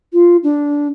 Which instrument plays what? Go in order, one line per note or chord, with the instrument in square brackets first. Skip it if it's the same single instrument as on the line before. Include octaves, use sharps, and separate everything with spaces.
[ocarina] F4
D4